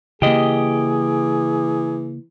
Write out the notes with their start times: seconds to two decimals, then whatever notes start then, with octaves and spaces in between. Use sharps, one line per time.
0.22 C#3 E3 A#3 G4 G#4 D#5